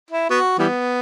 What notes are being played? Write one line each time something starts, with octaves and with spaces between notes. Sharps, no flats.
E4
B3 F#4
E3 G3 B3